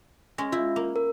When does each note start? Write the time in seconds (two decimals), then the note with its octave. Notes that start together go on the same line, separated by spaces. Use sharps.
0.38 G#3 C#4 A#6
0.52 E4 F4
0.76 A#3
0.96 A#4